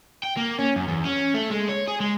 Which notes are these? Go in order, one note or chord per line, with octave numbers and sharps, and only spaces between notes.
G5
A#3
C#4
F#2
E2
C#4
A3
G#3
C#5
G#4
G#3